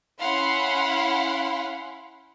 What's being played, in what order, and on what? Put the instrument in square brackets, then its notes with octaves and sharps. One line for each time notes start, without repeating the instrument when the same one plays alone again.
[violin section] C#4 E4 F5 F#5 B5 C6